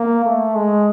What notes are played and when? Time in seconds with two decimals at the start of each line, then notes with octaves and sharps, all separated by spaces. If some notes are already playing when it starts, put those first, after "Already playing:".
Already playing: A#3
0.24 A3
0.55 G#3